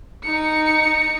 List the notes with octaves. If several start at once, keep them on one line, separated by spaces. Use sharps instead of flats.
D#4 C#7